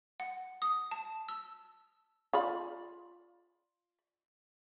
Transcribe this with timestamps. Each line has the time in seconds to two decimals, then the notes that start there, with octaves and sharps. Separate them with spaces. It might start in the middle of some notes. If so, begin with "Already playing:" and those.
0.20 F#5
0.62 D#6
0.91 A5
1.29 E6
2.33 F4 D5 B5